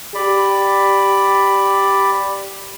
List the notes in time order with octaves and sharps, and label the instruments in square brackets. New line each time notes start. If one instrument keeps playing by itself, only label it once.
[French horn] G4 [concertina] D5 B5